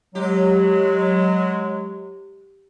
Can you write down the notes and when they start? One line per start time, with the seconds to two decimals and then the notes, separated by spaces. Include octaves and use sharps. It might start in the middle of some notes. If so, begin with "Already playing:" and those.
0.15 F#3 G#3 G4